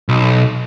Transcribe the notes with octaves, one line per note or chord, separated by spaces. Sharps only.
B1